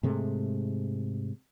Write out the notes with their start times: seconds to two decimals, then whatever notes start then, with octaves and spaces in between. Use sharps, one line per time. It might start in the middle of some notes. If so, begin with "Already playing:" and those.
0.03 G#2 C3 G#3 A3